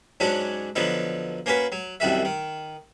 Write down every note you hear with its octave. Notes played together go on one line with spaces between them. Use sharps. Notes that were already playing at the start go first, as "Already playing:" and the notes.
G#2 F#3 C#4 D4 F#4
D3 F3 F#3 B3 D#4
A#3 C#4 F#4 B4
F#3
C2 F#2 D#3 F#4 E5
D#3